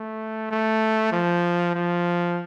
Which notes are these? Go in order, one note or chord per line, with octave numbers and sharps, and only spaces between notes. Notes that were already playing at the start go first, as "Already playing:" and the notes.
Already playing: A3
A3
F3
F3